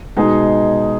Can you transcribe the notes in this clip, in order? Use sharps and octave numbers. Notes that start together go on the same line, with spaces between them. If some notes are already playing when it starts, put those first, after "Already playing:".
B2 G#3 D#4 G#4